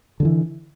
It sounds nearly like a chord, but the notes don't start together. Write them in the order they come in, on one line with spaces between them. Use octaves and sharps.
D3 G3 E3